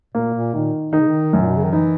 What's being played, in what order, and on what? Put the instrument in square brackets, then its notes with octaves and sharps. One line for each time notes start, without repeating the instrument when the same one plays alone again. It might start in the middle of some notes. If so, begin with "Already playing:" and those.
[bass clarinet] A#2 [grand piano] A#3
[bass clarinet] A#2
[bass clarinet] A#2 [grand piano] D#3
[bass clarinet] D#3 [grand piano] D#4
[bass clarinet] C#3
D#3
[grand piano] F#2
[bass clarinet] A#2
B2
C#3
D#3
[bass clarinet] E3 [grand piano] D#4